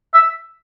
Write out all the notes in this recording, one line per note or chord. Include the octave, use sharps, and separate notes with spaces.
E5